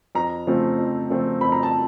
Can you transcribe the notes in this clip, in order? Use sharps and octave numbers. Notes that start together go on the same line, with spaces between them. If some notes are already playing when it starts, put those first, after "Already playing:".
F2 A#5
C#3 F3 A3 C4
F2
C#3 F3 A3 C4
F2 B5
A#5
A5